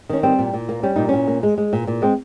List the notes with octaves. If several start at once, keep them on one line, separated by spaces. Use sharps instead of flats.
D#3 C#4
G3 C4
A#2
A#2
A#3
G3 C#4
A#2 D#4
A#2 C#4
A#3
G#3
G#3
A#2
A#2
G#3 C4